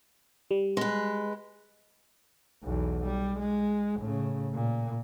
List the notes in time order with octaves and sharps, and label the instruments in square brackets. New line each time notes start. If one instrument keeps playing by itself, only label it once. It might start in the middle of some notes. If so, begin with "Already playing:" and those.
[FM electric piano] G3
[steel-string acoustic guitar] G#3 B4
[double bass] B1 E2
G3
G#3
A2 C#3
A#2